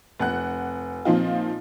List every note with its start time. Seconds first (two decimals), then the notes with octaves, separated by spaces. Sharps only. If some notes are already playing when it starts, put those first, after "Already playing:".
0.20 F1 F#5 F#6
1.05 A#2 F3 C4 D#4 F4